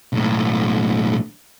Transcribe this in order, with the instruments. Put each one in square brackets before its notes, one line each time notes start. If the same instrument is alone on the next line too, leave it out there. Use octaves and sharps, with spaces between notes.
[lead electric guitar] B1 A2